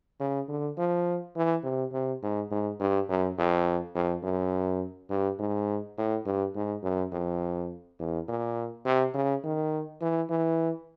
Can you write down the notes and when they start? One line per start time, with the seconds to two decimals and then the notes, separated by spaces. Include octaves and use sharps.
0.20 C#3
0.49 D3
0.78 F3
1.36 E3
1.64 C3
1.93 C3
2.23 G#2
2.51 G#2
2.80 G2
3.09 F#2
3.38 F2
3.95 F2
4.24 F#2
5.10 G2
5.39 G#2
5.98 A2
6.26 G2
6.56 G#2
6.83 F#2
7.12 F2
7.99 E2
8.28 A#2
8.86 C3
9.14 C#3
9.44 D#3
10.02 E3
10.30 E3